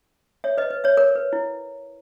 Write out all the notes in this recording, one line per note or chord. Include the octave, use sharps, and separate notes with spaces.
C#5 E5
B4 D#5
B4
C#5 E5
A#4 C#5
B4
E4